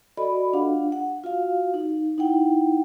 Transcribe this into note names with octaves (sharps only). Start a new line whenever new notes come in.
F#4 A4 D5 D#5 B5
D4 F4 G4 F5 F#5
F#5
F4 F#4 F5
D#4
D#4 E4 F#5 G5